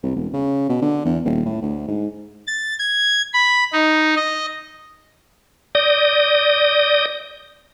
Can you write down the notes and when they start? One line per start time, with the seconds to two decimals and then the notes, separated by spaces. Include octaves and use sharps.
0.03 C2
0.16 E1
0.33 C#3
0.69 B2
0.82 D3
1.05 E2
1.25 D#1
1.46 A2
1.62 D2
1.88 G#2
2.47 A6
2.79 G#6
3.34 B5
3.73 D#4
4.16 D#5
5.75 D5 D#6 G6 A#6